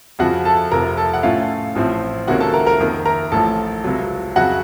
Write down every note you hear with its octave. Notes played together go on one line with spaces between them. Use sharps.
F2 C#3 F3 F#4 F#5
A4 A5
F1 F2 C3 A#4 A#5
A4 A5
F#5
A2 A3 C#4 F4 F5
A1 A2 F3 C4
C#2 C3 D#3 A#3 C#4 F#4 F#5
A4 A5
A#4 A#5
A#4 A#5
F2 D#3 A#3
A#4 A#5
A1 A2 F3 A4 A5
C#2 C3 F#3
F2 C#3 F#3 F#4 F#5